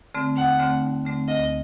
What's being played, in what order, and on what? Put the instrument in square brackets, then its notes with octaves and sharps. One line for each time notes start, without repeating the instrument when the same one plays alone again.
[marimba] D3 A3 C4
[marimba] D#2 [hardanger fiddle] F#5
[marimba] D3 A3 C4
D#2
D3 A3 C4
[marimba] D2 [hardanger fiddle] D#5